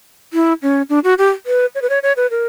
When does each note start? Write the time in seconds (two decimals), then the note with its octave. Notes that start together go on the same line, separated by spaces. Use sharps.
0.33 E4
0.62 C#4
0.89 D4
1.04 F#4
1.18 G4
1.46 B4
1.75 C#5
1.82 B4
1.90 C#5
2.03 C#5
2.17 B4
2.31 A#4